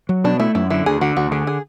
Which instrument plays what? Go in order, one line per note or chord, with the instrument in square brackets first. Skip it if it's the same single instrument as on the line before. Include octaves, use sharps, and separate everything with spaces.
[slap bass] F#3
[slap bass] B2 [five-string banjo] D4
[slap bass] A3 [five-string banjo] E4
[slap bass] F#2 [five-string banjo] E4
[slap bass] D3 [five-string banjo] E4
[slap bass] D2 [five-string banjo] G#4
[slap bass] D3 [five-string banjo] F#4
[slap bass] D2 [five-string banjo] F#4
[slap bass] D3 [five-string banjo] G#4
[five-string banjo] G#4